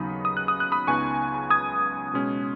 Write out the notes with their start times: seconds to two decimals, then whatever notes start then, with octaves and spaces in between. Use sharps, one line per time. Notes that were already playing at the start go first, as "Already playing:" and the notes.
Already playing: D#2 C#3 F#3 B3 D#4 B5 D#6
0.25 D#6
0.37 F#6
0.48 D#6
0.60 F#6
0.72 B5 D#6
0.87 C#2 C#3 B3 D#4 G#5 C#6
1.50 D#6 G#6
2.13 B2 G#3 C#4